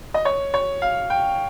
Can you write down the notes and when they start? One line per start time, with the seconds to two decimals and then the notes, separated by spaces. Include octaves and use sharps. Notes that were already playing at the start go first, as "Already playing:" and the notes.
0.14 D#5
0.25 C#5
0.54 C#5
0.82 F5
1.10 G5